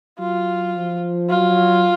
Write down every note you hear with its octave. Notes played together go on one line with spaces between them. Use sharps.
F#3 F4
F3
F#3 F4